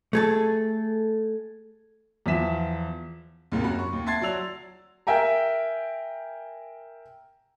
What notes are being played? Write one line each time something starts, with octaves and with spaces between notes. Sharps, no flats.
A3 G#4 A4
E2 F3 E5 B6 E7
D#2 G#2 C3 A#3
F#2 F#4 B5
C#6
D#2
E5 A5 C6 G#6 A6 C7
F#3 F#4 D5 E6 F7
A#4 E5 G5 G#5 A#5